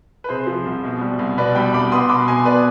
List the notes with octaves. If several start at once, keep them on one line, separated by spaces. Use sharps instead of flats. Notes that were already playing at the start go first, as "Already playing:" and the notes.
B4
C3 G#4 C5
F3
C2
B2
G3
C2
B2 B4 D5
G3 G5 B5
C2 B5 D6
B3 C6 D#6
B2 B5 D6
B2 G#5 C6
B3 B4 D5